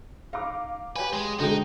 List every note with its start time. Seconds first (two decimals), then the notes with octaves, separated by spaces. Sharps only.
0.33 D#4 F5 D6
0.96 G4 B4 C#5 G#5
1.13 G#3
1.40 D3 G#3 D#4 F#4 C5 G5